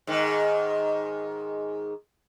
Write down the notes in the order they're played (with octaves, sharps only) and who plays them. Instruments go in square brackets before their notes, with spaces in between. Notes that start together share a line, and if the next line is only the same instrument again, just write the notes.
[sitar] G#2 D#3